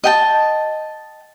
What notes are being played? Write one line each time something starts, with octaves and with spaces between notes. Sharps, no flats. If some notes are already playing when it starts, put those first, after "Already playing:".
D#5 G5 A5